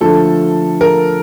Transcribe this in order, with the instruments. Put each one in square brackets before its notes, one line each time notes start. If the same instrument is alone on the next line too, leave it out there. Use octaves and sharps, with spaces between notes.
[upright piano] D3 F3 A3 [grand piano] A4
[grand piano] A#4